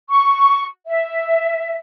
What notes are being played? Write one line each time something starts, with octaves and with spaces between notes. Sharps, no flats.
C#6
E5